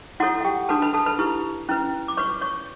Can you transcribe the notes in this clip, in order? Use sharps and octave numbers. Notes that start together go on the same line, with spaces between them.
E4 F#4 A4 C#5 F#5
F#5
G4 G5
D4 F#4 A4 B4 A5
B4 B5
A4 A5
B4 B5
E4 G4 B4
C#4 E4 B4
D6
F#4 B4 C#5 C#6
C#5 C#6